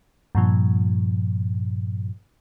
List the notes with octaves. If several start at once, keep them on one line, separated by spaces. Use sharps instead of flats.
G2 A#2 F3